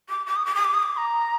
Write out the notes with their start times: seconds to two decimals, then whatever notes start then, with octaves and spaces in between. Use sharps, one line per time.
0.09 D6
0.26 D6
0.36 D#6
0.45 D6
0.55 D#6
0.65 D6
0.74 D#6
0.83 D6
0.97 A#5